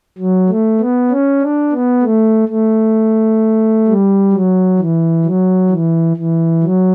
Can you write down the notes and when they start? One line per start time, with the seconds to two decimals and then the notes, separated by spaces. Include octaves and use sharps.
0.18 F#3
0.49 A3
0.80 B3
1.11 C#4
1.41 D4
1.72 B3
2.03 A3
2.48 A3
3.87 G3
4.32 F#3
4.79 E3
5.25 F#3
5.70 E3
6.17 E3
6.63 F#3